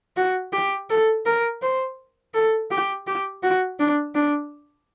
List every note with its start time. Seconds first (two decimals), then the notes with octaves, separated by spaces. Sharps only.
0.17 F#4
0.53 G4
0.90 A4
1.26 A#4
1.62 C5
2.34 A4
2.71 G4
3.07 G4
3.43 F#4
3.80 D4
4.15 D4